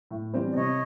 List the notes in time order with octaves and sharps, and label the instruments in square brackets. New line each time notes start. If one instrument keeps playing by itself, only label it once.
[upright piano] A2
E3 G3 C4
[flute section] D5
[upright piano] C3 [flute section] C#5 D#5